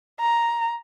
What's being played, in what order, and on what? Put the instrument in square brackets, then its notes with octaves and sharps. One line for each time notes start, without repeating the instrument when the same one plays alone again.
[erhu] A#5